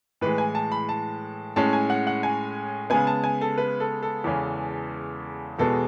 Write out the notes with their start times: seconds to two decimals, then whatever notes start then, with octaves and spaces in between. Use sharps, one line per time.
0.21 A2 E3 G#3 B4
0.38 G#5
0.55 A5
0.72 B5
0.89 A5
1.56 A2 G#3 C#4 A5
1.73 G#5
1.90 F#5
2.07 F#5
2.23 G#5
2.90 C#3 G#3 B3 G#5
3.07 A5
3.24 G#5
3.41 A4
3.58 B4
3.80 A4
4.03 A4
4.24 E2 C#3 E3 G#3 C#4
5.59 E2 B2 G#3 B3 A4